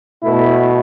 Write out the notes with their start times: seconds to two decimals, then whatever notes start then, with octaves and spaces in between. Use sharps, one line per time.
0.23 B2 A3 E4